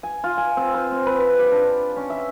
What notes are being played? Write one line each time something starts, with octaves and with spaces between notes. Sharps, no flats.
G#5
F4
G#5
C4
C5
C4
B4
G4
D4
C#4
E5